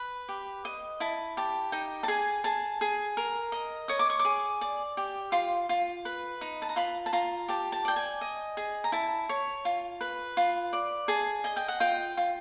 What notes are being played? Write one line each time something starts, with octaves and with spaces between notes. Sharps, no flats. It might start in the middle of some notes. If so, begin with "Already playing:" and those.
Already playing: B4
G4
D#5
E4 A5
G4 A5
D#4 G5
A5
G#4 G#5
G#4 A5
G#4
A#4
D#5
C#5 D#6
D6
C#6
D6
G#4
D5
G4
F4 C6
F4
B4
D#4
A5
A#5
F4 B5
A5
F4 A#5
G4 A5
A5
D5 G5
G#5
D#5
G#4
A#5
E4 A5
C#5
F4
B4
F4
D5
G#4 A5
D#5 G#5
G5
F#5
F4 G5
F4